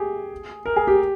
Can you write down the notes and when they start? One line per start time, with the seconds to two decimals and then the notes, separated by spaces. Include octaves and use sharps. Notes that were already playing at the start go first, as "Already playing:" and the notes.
Already playing: G4 G#4
0.66 A#4
0.76 G#4
0.87 G4